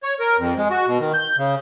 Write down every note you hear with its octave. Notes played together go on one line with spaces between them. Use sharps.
C#5
A#4
F2
G#3
F#4
B2
D#3
G6
C#3